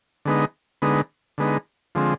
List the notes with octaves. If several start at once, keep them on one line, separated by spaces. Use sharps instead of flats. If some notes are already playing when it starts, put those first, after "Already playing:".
D3 G#3 B3 D#4
D3 G#3 B3 D#4
D3 G#3 B3 D#4
D3 F3 G#3 C4